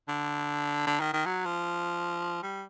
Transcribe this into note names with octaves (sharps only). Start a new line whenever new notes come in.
D3
D3
D#3
D#3
F#3
F3
G3